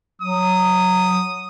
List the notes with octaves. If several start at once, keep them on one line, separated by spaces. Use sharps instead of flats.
F#3 D#6